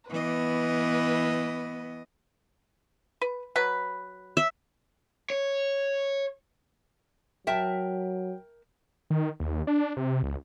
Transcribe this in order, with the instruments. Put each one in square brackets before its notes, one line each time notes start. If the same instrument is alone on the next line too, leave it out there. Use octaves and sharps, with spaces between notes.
[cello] E3 D#5 [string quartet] B3 B4
[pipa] B4
F#3 B4 B5
[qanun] E5
[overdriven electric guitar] C#5
[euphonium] F#3 [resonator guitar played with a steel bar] A#4 E5 A5 [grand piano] G5
[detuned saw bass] D#3
D#2
D4
C3
C#2